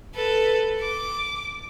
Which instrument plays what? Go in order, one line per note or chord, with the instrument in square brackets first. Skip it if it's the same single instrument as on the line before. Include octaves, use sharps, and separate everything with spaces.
[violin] A4 B4
D6